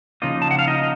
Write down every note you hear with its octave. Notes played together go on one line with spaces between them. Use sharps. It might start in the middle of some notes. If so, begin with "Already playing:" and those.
C#3 F3 A#3 D#4 F4 D#5
A5
F#5
F5
D#4 D#5